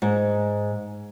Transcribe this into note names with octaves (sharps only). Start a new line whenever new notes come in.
G#2